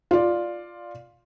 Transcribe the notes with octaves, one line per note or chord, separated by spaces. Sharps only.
F4 D5